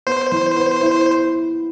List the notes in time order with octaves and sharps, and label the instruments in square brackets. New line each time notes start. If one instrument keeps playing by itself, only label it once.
[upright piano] B3 [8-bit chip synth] C5
[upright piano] E3
B3
E4